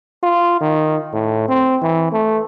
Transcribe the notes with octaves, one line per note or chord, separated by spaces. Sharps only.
F4
D#3
A2
C4
E3
A3